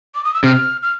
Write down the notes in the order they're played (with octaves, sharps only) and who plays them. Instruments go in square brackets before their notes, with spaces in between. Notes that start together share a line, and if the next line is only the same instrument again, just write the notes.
[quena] D6
D#6
E6
[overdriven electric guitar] C3 [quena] F6
[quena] F6